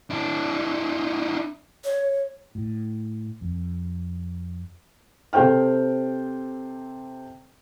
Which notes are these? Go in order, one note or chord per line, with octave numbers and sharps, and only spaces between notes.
D4 E4
C#5
A2
F2
C3 A4 C5 G5 F6